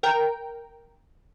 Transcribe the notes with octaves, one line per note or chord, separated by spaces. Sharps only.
A#4 G5